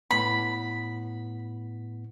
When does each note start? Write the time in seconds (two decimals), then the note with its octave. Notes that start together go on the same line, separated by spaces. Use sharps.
0.11 A2 B3 B5